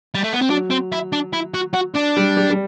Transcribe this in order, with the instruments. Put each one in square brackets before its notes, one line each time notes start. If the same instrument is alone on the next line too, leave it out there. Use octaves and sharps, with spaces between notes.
[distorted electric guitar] G3
A3
B3
C4
[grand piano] F#3 [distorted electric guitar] D4
[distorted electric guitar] C4
E4
D4
E4
F#4
F#4
D4
[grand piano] G3
G3
G3